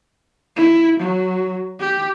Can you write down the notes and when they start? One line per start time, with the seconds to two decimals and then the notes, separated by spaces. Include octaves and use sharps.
0.56 E4
1.00 F#3
1.80 G4